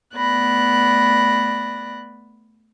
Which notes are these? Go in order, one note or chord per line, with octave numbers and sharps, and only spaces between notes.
A3 B3 D5 B5 F#6 A#6